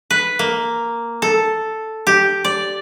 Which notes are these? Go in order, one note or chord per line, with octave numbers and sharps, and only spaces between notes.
B4
A#3
A4
G4
D5